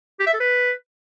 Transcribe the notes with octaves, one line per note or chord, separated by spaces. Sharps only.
G4
E5
A4
B4